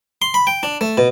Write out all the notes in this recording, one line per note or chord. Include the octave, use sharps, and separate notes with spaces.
C6
B5
G5
D4
A3
B2